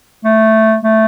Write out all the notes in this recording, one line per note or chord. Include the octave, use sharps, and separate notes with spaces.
A3
A3